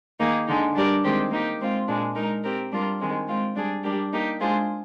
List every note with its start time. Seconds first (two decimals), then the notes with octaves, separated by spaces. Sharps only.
0.19 D#3 A#3 D#4 G#4
0.47 D3 G#3 D#4
0.75 G3 D4 G4 A#4 D5
1.04 D#3 G#3 C4 G4
1.31 A#3 D#4 G4
1.60 G#3 C4 F4
1.88 A#2 G#3 D4
2.15 G#3 D#4 A#4
2.43 C4 G4 A#4
2.71 G3 D4 F4 A#4
3.00 D#3 G#3 C4
3.28 G#3 C4 F4
3.56 G3 D4 G#4
3.83 G3 D4 G4 A#4
4.13 A#3 D#4 G4
4.40 G#3 D4 F4 G#4 C5